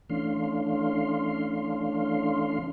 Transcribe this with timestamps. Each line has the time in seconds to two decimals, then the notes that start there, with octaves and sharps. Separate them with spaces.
0.10 E3 A3 C#4 D4 F5 C6